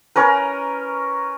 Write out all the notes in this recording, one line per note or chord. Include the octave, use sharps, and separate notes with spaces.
C#4 A#4 B4